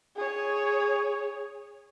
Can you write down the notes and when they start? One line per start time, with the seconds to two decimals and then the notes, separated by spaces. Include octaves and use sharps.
0.17 G#4 C#5